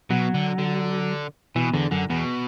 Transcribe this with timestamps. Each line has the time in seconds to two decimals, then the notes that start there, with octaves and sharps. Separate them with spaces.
0.10 B2 F#3
0.34 D3
0.58 D3
1.56 B2 E3
1.74 E2 D3
1.91 F#2 D3
2.10 E2 B2